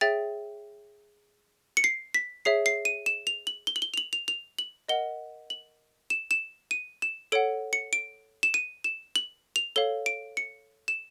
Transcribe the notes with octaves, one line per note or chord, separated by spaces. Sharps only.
G#4 C#5 E5 G5 A6
C#7
C7
B6
G#4 C#5 E5 C7
C7
D#7
E7
F7
F#7
G7
F#7
G7
F7
F#7
F7
F7
F#7
A#4 D#5 F#5 G7
F#7
E7
E7
D#7
E7
A4 C#5 F#5 D7
C#7
D7
E7
D#7
E7
F#7
F7
A4 C#5 F5 G7
D7
C#7
E7